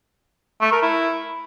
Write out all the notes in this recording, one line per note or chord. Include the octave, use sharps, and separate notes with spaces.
A3
A#4
E4